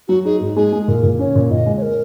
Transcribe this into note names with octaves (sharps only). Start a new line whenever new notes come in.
F#3 F#4
D#4 G#4
G#2
G#3 G#4
G#3
A#2 A#4
A#2
C#4 C#5
A#2
A#2 D#5
G#3
C#5
A#4